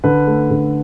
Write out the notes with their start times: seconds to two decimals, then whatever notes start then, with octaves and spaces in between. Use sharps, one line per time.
0.04 D3 B4
0.27 A3
0.51 D3